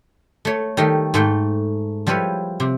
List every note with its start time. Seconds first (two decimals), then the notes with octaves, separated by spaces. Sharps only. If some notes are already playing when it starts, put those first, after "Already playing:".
0.45 A3 C#5
0.77 D#3 G3 A3
1.14 G#2 A3 G5
2.07 F3 G3 E4 B4 C#5
2.60 C3